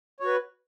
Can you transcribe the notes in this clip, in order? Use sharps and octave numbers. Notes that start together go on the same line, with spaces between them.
F#4 B4 C#5